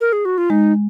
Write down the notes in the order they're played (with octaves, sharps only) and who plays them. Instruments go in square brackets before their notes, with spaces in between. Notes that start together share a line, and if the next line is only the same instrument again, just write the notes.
[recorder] A#4
G#4
F#4
F4
[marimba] G#3 [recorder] D#4